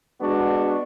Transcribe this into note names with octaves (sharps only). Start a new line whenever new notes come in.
G#3 B3 D4 F#4